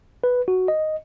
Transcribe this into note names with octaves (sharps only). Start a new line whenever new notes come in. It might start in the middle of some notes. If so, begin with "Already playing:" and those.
B4
F#4
D#5